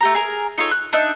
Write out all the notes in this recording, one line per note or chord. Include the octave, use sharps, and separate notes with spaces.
A3 G4 A#5
G#4 A#4
D#4 F4 A4 C#5
F#6
D4 D#4 E5 F#6